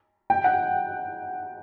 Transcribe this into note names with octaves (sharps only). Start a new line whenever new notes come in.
G5
F#5